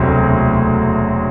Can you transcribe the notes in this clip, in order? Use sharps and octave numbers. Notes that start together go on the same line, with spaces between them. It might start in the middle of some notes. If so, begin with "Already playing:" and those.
Already playing: E1 D2 C3 F#3 C4